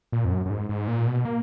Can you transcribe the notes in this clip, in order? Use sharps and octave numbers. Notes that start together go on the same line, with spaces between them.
A#2
F2
F#2
F#2
G#2
G#2
A#2
B2
A#3